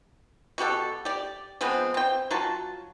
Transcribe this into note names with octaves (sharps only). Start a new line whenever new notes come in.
B2 F#4 G4 A4
G4 D5
F3 G#3 B3 C4
C4 G5
F#3 F4 A5